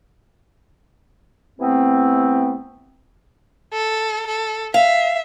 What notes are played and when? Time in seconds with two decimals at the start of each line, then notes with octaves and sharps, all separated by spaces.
1.59 C3 E3 A3 B3 C4
3.73 A4
4.26 A4
4.74 E5 F5